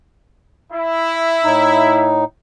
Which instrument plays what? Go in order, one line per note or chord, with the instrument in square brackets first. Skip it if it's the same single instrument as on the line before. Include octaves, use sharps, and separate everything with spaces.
[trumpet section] E4 E5
[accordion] A2 D#4